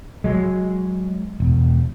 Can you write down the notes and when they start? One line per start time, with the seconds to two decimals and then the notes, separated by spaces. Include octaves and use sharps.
0.24 F#3 G#3
1.40 E1